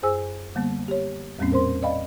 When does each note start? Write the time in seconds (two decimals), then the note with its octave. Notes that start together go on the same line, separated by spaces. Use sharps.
0.03 F#2 G#4 C5 G#5 E6
0.55 D3 G3 A#3 B3
0.88 G4 C#5
1.39 E2 A2 G3 A#3 C4 C#4
1.51 A#2 A#4 C5 C6
1.82 D5 D#5 F5 G5 B5